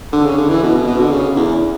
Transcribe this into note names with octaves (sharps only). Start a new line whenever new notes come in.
D3
C#3
D3
E3
B2
B2
B2
D3
C#3
E2